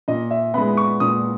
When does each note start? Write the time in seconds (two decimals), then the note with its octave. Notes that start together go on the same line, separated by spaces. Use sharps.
0.08 A#2 D#5
0.31 E5
0.54 G#3 B3 B5
0.77 C#6
1.00 A#2 D#6